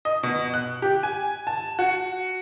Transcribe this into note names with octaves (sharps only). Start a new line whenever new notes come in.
D#5
B2
F#6
G4
G#5
A5
F#4